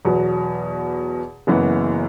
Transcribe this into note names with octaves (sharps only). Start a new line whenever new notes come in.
E2 B2 F#3
F#1 F#2 E3 B3